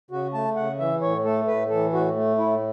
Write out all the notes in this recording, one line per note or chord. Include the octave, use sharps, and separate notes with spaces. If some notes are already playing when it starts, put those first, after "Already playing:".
C#3 F#4
A3 A5
C#3 F#5
E3 E5
A2 C#5
A3 A4
A2 B4
E3 A4
A2 F#4
A3
A2 E4